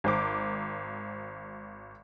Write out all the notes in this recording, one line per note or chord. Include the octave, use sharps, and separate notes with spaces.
G#1 C5 D6